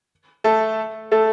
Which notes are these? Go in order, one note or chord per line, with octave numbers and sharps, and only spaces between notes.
A3 A4
A3 A4